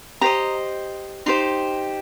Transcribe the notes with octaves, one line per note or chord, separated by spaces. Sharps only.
G4 C5 D#5 A#5
D#4 G4 C5 C6